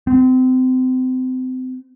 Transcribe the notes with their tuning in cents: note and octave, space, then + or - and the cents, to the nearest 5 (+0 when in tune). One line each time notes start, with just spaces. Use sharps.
C4 -30